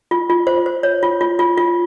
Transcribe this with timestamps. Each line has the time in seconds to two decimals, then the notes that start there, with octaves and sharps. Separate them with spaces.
0.11 F4
0.30 F4
0.47 C5
0.66 C5
0.83 C#5
1.03 F4
1.21 F4
1.39 F4
1.58 F4